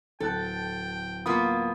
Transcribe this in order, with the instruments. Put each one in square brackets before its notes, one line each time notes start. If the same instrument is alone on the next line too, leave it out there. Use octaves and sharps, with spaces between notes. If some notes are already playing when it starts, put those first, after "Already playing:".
[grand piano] D1 A5 F#6 [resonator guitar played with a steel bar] A4 [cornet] G5
[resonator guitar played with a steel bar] A#3 B3 F4 [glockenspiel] B5 D#6